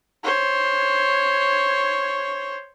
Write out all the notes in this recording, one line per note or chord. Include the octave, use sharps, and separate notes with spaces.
C5 C#5